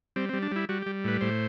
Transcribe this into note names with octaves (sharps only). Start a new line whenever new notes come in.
G3 C4
G3 C4
D4
G3 E4
G3 F#4
G4
G3
A2 B4
A2 C5